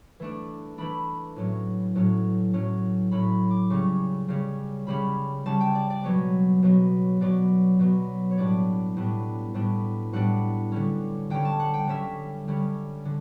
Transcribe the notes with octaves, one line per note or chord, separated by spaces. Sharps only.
E3 A3 D4
E3 A3 D4 B5
A2 F#3 C#4
A2 F#3 C#4
A2 F#3 C#4
A2 F#3 C#4 B5
D6
C#3 G3 C#4 C#6
C#3 G3 C#4
C#3 G3 C#4 B5
C#3 G3 C#4 A5
G5
D5
D5
B2 F#3 B3 C#5
B2 F#3 B3
B2 F#3 B3 D5
B2 F#3 B3
C#5
A2 G3 B3 D4 D5
A2 G3 B3 D4
A2 G3 B3 D4
A2 G3 B3 D4 F#5
D3 G3 C#4
D3 G3 C#4 G5
A5
F#5
G5
D3 G3 C#4 E5
D3 G3 C#4
D3